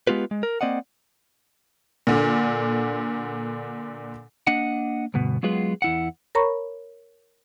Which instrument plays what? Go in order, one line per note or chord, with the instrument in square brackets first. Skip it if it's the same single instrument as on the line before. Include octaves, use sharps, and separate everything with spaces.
[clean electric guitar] G#3 B3 F4 G4 B4
G#3
A#4
A#3 C4 D5 D#5 F#5
[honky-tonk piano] A#2 D3
[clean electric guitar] A#3 D4 D#5 F#5
D2 G2 B2 B3
F#3 G#3 B3 F4 G#4 B4
E2 E4 F#5
[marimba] A#4 C#5 A#5 B5 C#6